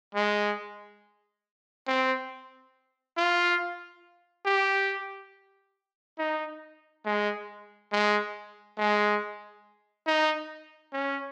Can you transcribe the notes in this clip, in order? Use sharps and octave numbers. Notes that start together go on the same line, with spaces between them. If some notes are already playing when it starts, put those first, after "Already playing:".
G#3
C4
F4
G4
D#4
G#3
G#3
G#3
D#4
C#4